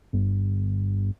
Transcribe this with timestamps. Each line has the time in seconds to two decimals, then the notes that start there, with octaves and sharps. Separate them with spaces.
0.13 G1